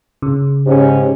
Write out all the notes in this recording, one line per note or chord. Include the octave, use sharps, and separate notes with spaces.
C#3
G#2 C#4 G4